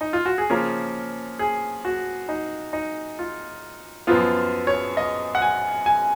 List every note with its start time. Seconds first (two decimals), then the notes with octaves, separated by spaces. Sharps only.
0.01 D#4
0.13 F4
0.26 F#4
0.38 G#4
0.50 C#3 F3 A#3 C#4 A#4
1.39 G#4
1.85 F#4
2.29 D#4
2.73 D#4
3.19 F4
4.07 F#2 F3 B3 F4
4.67 C#5
4.97 D#5
5.35 F#5
5.42 G#5
5.86 G#5